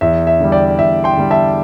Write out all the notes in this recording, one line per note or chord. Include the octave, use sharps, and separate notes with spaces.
E2 E5
E5
D3 G3
D5 G5
E2 E5
G5 C6
D3 G3
E5 A5